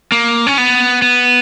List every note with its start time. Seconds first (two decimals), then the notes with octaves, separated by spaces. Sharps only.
0.12 A#3
0.47 C#4
0.58 B3
1.02 B3